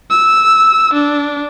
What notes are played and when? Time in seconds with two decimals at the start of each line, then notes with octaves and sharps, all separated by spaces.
0.11 E6
0.93 D4